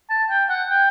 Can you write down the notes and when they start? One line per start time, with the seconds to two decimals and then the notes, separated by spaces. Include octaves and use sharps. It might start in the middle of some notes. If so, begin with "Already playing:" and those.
0.10 A5
0.30 G5
0.49 F#5
0.70 G5